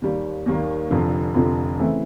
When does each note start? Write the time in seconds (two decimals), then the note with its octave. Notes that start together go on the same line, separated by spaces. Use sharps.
0.02 D#2 D#3 G3 A#3
0.46 D#2 D#3 G3 A#3
0.90 F1 F2 D3 F3
1.34 F1 F2 D3 F3
1.79 C#3 E3 A3 C4 E4